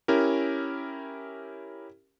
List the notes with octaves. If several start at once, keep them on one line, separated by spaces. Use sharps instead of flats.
C#4 E4 G4 A#4